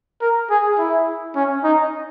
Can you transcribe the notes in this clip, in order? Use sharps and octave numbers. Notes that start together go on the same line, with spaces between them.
A#4
G#4
E4
C#4
D#4